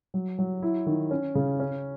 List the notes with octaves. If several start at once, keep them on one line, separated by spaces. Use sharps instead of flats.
F#3
F#3
E4
D#3
C#4
C#3
C#4